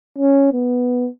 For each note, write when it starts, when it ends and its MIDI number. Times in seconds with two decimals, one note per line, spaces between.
0.19 0.53 61
0.53 1.09 59